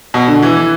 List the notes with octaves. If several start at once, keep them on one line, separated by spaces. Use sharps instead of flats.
B2
D3
E3
E3